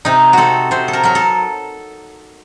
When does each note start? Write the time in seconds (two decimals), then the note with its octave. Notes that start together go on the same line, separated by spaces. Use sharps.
0.05 C3 D#4
0.33 C4 F#4 A4
0.71 C3 C5
0.88 A4
0.93 A#4
1.03 F#3 A#4
1.15 A4